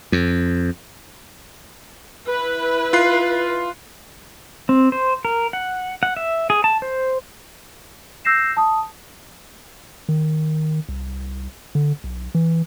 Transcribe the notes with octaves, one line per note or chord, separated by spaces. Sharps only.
F2
E4 B4
F4 F#6 C7
C4
C5
A#4
F#5
F#5
E5
G#4
A5
C5
E6 G6 A#6 C7 E7
A5 D#6
D#3
C2
D3
B1
E3